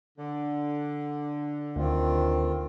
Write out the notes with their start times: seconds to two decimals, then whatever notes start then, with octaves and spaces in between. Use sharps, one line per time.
0.18 D3
1.76 D2 D#3 C4 F4